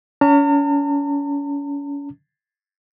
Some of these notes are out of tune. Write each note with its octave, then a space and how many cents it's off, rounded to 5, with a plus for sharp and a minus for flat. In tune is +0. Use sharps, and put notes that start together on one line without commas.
C#4 +35 A#5 -45